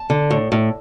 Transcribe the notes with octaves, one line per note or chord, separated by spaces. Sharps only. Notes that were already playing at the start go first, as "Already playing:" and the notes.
Already playing: A5
D3
A2
A2